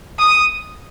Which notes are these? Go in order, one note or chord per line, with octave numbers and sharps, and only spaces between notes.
D#6